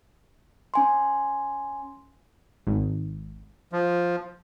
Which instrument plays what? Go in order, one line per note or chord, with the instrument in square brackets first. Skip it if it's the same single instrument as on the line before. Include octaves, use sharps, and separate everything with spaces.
[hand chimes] C#4 G#5 C6
[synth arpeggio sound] G#1
[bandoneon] F3